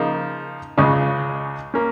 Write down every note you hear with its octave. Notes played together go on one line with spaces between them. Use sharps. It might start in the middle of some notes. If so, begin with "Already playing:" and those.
Already playing: C#3 F3 A#3 D#4
C#2 C#3 G#3
A#3 C#4